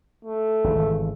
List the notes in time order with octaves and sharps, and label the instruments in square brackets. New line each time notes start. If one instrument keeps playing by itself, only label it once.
[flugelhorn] A3
[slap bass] G#1 C#3 E3